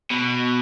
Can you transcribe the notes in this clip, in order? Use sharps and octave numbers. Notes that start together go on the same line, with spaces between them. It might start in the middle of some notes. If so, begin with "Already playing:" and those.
B2